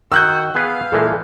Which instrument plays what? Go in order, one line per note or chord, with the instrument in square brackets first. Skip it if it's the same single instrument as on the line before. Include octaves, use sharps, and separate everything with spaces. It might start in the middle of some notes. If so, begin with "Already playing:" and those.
[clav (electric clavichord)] D#3 [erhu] F#4 [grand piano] E6 F#6 G6
[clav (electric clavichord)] B3 G#4 B4 [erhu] F5
[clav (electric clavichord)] A#2 E3 G#3 [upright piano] A4